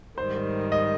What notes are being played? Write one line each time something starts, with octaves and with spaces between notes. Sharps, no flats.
G#2 D#3 G3 C5
D#5